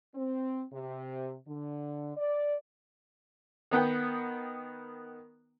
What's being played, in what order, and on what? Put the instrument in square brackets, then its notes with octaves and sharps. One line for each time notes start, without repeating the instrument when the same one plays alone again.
[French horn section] C4
C3
D3
D5
[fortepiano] D#3 B3 F#5 G5